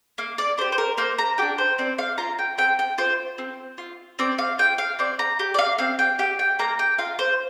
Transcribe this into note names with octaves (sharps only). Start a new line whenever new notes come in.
A#3 F5
D5
D4 G4 C5
C5
A#4
A#3 C5
A#5
D4 G4 G5
C5
C4 D5
F5
F4 A#5
G5
C4 G5
G5
F4 C5
C4
F4
C4 D5
F5
F4 G5
F5
C4 D5
A#5
G4
D5
F5
C4 F5
G5
G4 G5
G5
A#3 A#5
G5
F4 F5
C5